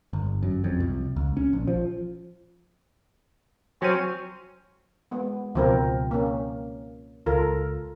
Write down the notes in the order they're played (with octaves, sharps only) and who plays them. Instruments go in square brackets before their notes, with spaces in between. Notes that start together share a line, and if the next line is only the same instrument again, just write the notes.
[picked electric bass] G1
F#2
F2
C2
C#2
C#4
A#1
F3
[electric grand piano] F#3 D#7 [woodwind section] C4 C#4
[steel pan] G#3 B3
[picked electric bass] C#2 B2 [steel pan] F3 C4 A#4
[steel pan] A#3 C#4
[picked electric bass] C#2 [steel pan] F4 A4 A#4